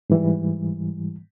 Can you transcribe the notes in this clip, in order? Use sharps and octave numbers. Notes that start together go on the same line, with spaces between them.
G#2 E3 G3